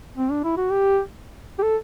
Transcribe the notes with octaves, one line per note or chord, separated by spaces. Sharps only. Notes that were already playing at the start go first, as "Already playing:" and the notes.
C4
D4
E4
F#4
G4
G4
A4